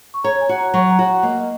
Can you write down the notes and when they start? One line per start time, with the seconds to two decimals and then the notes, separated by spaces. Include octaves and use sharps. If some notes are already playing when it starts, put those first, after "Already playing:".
0.14 C#6
0.24 C#5 A#5
0.41 G#5
0.49 F#4
0.58 A#5
0.74 F#3 C#6
0.91 A#5
0.99 F#4
1.23 A#3 D#5
1.40 D#5